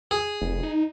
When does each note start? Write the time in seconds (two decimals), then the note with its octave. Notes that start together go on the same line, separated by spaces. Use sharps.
0.11 G#4
0.42 F1
0.63 D#4